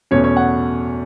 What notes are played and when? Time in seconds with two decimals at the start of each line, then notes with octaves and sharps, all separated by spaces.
0.11 E2 B2 A3 C#4 C#5
0.24 C#5
0.37 F#5